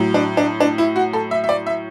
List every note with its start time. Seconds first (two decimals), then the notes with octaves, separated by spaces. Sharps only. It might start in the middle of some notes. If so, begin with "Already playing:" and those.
Already playing: A2 F#3
0.14 D4
0.37 D4
0.60 D4
0.78 E4
0.96 F#4
1.13 A4
1.31 E5
1.44 E5
1.49 D5
1.67 E5